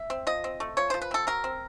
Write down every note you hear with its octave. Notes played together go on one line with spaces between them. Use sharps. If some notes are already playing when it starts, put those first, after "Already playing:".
Already playing: E5
C4
F3 D#5
C4
A3
F3 C#5
F3 C5
B4
C4 A4
F#3 A#4
C4